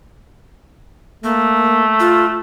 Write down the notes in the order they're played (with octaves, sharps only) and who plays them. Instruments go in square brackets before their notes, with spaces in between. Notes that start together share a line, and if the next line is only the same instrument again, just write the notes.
[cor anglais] A3 [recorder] A#3
[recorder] F4